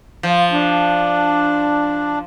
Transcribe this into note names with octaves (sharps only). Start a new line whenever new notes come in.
F3
D4